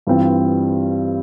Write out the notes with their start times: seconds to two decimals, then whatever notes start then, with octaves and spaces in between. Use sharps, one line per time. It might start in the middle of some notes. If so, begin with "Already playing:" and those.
0.07 G2 E3 G3 C4 F4